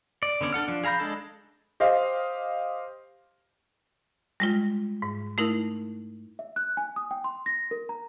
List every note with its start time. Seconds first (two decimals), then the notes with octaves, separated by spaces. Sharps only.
0.23 D5
0.41 D3 B3 C#4 D5
0.53 D4 A4 F#5 F6
0.68 F3 D4
0.84 G#4 F5 A#5 B5 G6
1.00 G#3 D4 A4
1.80 G4 C5 D#5 F5
4.40 G3 G#3 F4
5.02 G#2
5.38 A3 D#4 E4 A#4
6.39 E5
6.56 F#6
6.77 G#5
6.96 D#6
7.11 G5
7.24 C6
7.46 A#6
7.71 A#4
7.89 A#5